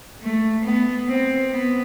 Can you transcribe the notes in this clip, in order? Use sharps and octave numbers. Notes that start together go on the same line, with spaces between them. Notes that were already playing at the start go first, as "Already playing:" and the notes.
A3
B3
C4
B3